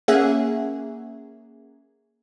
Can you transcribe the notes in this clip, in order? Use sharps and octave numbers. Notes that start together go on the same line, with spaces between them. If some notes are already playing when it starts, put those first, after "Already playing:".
A#3 C#4 G#4 E5 F#5